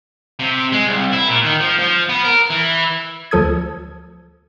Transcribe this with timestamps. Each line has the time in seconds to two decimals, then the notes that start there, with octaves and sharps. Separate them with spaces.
0.40 C3
0.72 G#3
0.86 C2
1.13 E4
1.28 A#2
1.44 D#3
1.60 F3
1.79 F3
2.09 B3
2.25 A#4
2.50 E3
3.31 D2 F3 A4 D#6 G#6